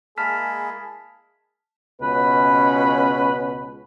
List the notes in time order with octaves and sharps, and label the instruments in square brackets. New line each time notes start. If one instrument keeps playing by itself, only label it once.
[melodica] G#3 A#3 E4 [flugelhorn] G#4 [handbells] A5 F6 B6
[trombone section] C#2 B2 C#4 [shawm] B4